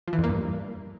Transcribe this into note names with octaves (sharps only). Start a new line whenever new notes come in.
F3
E3
F2
A#3
G2